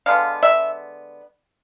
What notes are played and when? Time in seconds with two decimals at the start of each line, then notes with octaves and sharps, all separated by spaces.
0.06 D3 G#3 B3 F5
0.43 E5